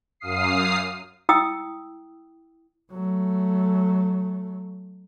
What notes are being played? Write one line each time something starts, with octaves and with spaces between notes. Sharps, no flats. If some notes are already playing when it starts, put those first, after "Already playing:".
F#2 F5 D#6 C7
E4 G5 D#6 E6
F#3 A3